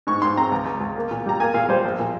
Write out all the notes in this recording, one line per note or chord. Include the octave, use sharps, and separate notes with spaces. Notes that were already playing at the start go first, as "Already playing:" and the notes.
G#2 C#6
G#2 C6
C4 A#5
C#2
C#2
C#2
A#3
A#2
G3 A#5
A#3 G#5
A#2 F5
G3 C5
A#1
A#2